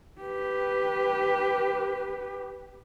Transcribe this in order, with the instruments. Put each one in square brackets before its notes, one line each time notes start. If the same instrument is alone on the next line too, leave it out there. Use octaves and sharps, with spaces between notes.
[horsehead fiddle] G4 B4